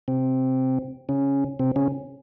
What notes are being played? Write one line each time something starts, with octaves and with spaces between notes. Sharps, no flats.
C3 C4
C#3 C#4
C3 C4
C#3 C#4